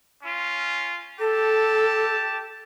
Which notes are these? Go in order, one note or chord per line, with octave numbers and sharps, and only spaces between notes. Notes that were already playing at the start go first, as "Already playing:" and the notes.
C#4 F4
G4 A4 A5